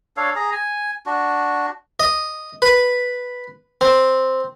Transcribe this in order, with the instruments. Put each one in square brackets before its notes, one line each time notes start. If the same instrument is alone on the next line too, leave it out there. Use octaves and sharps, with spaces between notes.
[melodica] D4 A4 C#5 F5
G#4 A#5
G#5
D4 F#4
[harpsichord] D#5
B4
C4